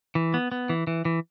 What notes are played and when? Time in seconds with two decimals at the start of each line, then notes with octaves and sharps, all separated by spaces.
0.15 E3
0.34 B3
0.52 B3
0.69 E3
0.87 E3
1.05 E3